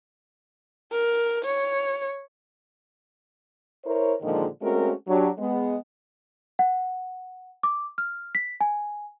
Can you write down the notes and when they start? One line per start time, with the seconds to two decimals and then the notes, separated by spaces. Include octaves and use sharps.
0.92 A#4
1.45 C#5
3.85 E4 A#4 C5 C#5
4.22 A#2 D3 D#3 F3 G#3
4.62 G#3 A3 C4 C#4 F#4 A#4
5.08 F#3 D4 G4
5.38 G#3 B3
6.59 F#5
7.63 D6
7.98 F6
8.35 B6
8.61 G#5